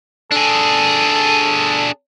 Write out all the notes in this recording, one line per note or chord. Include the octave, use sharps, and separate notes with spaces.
D4 G#4 A4